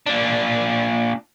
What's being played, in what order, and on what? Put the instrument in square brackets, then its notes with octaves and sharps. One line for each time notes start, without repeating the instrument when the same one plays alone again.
[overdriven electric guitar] A#2 D4